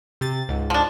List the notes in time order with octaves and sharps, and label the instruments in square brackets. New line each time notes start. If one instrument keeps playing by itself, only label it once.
[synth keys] C3 A6
C#2 G#2
[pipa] F3 D4